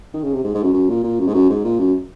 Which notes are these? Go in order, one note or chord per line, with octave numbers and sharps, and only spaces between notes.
D#3
C#3
C3
G#2
G#2
F#2
F#2
A#2
A#2
F#2
G#2
F#2
G#2
A#2
F#2